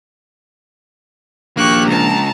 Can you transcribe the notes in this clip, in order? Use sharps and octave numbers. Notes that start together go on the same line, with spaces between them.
A#1 A#3 G4 C#6 F#6
C#2 A5 A#5